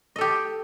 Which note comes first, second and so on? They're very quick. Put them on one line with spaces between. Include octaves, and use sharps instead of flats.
D#5 A4 G4